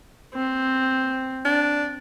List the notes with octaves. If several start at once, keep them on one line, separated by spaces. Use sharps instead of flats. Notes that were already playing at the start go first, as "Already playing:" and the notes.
C4
D4